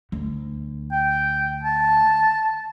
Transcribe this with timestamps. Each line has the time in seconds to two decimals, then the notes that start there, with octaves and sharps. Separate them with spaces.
0.12 D2
0.92 G5
1.63 A5